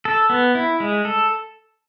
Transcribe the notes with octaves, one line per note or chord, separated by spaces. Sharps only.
A4
B3
E4
G#3
A4